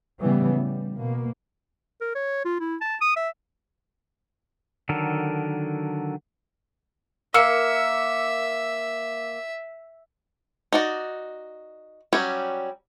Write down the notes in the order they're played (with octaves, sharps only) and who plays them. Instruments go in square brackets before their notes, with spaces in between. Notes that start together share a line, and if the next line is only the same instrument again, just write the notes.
[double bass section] A2 C#3 E3 G3 B3
G3
B2 A#3
[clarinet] A#4
C#5
F4
E4
A5
D#6
E5
[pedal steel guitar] D3 D#3 F#3 A4 A#4
[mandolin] A#3 [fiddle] E5 [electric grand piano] E6 C#7
[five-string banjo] D#4 F#4 D5
F#3 G3 C#4 G4